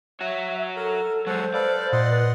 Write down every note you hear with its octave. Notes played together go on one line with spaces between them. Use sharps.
F#4 C#5 E5
A4 A#4
F#3 G#3 A4 C5 F#5
A4 B4 D5 F5
A#2 D#5 F#5 C6
B4